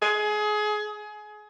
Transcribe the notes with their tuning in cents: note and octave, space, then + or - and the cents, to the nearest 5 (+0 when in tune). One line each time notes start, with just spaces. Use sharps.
G#4 +25